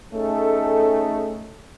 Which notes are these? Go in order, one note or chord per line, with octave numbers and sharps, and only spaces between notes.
A3 C#4 D#4 G#4 A4